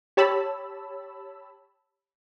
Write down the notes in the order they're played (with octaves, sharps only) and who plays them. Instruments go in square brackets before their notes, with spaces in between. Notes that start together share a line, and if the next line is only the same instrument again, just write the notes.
[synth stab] G4 C#5 A5 B5 E6